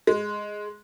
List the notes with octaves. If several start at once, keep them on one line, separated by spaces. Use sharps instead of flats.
G#3